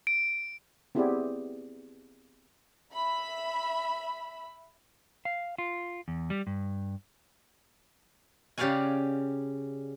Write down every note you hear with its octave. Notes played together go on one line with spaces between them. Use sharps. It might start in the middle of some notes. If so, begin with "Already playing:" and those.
D7
B3 C4 E4 G4 G#4 D5
E5 B5
F5
F4
E2
G3
G2
C#3 G4 D5 F5 F#5 G#5